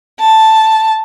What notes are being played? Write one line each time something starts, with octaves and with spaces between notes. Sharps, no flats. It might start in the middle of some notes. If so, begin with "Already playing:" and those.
A5